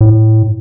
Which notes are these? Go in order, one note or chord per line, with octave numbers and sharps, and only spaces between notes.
A2